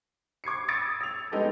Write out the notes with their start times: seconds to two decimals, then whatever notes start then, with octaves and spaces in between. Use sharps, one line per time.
0.44 D6 G#6 C7 C#7
0.68 D#6 E6 G#6 A6 C#7 D7
1.01 E6 F7
1.32 G#3 B3 D#4 G4 A4